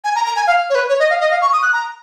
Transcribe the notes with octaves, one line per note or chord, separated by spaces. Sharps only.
G#5
A#5
A#5
G#5
F5
C#5
B4
C#5
D#5
F5
D#5
F5
C#6
D#6
F#6
A#5